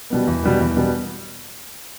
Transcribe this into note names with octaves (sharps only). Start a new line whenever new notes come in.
B2 G3 B3
E2
B2 G3 B3
E2
B2 G3 B3